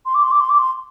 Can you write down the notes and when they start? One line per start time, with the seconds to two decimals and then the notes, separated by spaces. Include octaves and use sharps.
0.06 C6
0.15 D6
0.23 C6
0.31 D6
0.40 C6
0.49 D6
0.59 C6